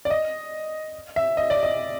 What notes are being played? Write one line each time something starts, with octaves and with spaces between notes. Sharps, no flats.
D5
D#5
E5
D#5
D5
D#5